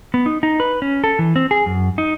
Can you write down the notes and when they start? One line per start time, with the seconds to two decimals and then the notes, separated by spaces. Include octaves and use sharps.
0.14 B3
0.26 D#4
0.43 D#4
0.60 B4
0.82 C#4
1.04 A4
1.19 E3
1.36 C4
1.51 G#4
1.66 F#2
1.98 D#4